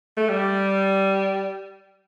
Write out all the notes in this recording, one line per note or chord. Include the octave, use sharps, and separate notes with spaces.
A3
G3